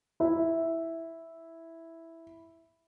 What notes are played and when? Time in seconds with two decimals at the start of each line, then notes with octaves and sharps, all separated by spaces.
0.20 E4 E5